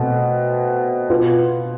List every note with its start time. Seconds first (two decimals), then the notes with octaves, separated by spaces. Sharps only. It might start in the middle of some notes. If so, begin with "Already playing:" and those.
Already playing: B2 A3 C4
1.10 B2 B3 F4